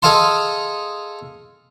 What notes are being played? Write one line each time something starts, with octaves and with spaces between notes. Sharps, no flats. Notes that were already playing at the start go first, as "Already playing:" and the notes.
G#4 A4 D#5 F5 A5 C6